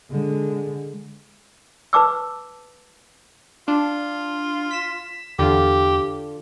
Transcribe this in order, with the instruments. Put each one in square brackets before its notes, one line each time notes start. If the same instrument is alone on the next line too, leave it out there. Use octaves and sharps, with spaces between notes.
[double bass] D3 G#3
[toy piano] B4 A5 D6 E6
[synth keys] D4 [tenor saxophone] F4
[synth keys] B6 E7
[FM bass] E2 [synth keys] D3 D4 F4 [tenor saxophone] G4